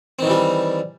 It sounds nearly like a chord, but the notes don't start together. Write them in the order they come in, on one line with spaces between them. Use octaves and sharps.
C4 D#3 E3 G3